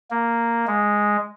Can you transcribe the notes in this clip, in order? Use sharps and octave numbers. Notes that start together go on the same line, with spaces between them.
A#3
G#3